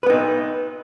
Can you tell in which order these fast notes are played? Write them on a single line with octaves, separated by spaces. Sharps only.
B4 B3 D#4